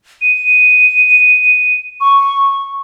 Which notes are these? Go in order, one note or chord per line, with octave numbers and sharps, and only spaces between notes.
D#7
C#6